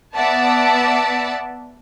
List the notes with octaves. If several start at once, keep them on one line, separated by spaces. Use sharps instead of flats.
B3 D5 E5 F#5 A5